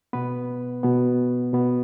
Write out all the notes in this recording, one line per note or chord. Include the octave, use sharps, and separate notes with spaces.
B2 B3 B4
B2 B3
B2 B3